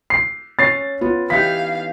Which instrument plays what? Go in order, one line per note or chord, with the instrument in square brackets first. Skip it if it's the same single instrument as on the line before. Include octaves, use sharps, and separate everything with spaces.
[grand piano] C7
[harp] C#4 [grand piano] A6 C7
[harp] B3 [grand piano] F4
[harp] E3 D#4 G4 [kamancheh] F5 [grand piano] B6